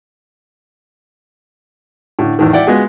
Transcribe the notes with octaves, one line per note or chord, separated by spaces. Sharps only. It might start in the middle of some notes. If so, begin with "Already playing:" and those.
A2 D3
E2 A2 D#3
E4 D5 F#5 G5
G#3 B3 F4 F#4 G#4